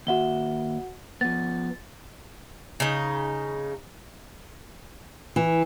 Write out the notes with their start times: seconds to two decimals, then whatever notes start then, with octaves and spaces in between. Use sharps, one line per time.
0.07 D#2 F#4 E5 F#5 G7
1.21 F3 B3 A6
2.80 C#3 D#4
5.36 E3